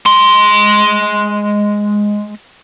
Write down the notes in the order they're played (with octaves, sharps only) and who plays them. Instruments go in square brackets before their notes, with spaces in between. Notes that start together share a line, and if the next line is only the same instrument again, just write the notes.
[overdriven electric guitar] G#3 C6